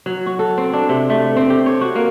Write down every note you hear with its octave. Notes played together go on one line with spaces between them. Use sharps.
F#3
F#4
A4
C4
D4
C3
A3
C4
G4
C#5
F#4
A#3